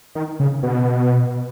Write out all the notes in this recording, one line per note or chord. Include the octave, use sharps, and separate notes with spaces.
D#3
C#3
B2